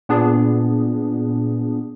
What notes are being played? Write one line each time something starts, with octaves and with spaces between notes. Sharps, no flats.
A#2 B3 D4 G#4